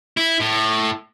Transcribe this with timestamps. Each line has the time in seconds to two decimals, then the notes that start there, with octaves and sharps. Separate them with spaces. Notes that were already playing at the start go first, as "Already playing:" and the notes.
0.17 E4
0.40 A2